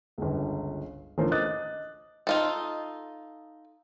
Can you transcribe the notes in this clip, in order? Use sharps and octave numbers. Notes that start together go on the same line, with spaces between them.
G1 C#2
A1 D3 A3 F4 A#4 C5
D#5 D6 D#6 F#6 A6
D#4 F4 A4